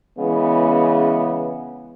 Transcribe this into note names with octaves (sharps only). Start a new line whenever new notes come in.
C#3 E3 G#3 B3